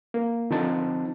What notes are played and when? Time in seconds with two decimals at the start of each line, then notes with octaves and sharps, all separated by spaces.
0.14 A#3
0.51 D3 F3 C4 D#4 A5